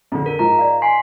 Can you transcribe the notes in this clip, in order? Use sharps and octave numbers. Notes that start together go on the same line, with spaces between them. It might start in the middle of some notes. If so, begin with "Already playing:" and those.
F2 D3
A#4
G#2 F3 A#5
D5 F5
G#5 C6 B6 C7